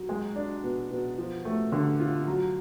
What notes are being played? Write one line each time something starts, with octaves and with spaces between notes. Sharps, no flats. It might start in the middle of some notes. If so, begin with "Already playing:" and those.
Already playing: F#3
G#3
D4
B2
B2
F3
A3
D3
F4
F#3